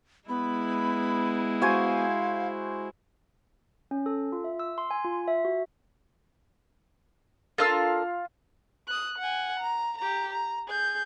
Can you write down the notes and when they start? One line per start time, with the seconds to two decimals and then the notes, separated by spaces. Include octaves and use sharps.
0.29 G#3 B3 E4 B5
1.62 F#4 C5 F5 G#5
3.91 C#4
4.06 A4
4.32 F4
4.44 E5
4.59 E6
4.78 C6
4.91 G#5
5.04 F4
5.28 E5
5.45 F#4
7.58 D4 F4 A4 A#4 F5 E6
8.87 D#6 F#6
9.18 F#5 G#5
9.60 A#5
9.97 G4 A#5
10.33 A#5
10.67 G#4 G6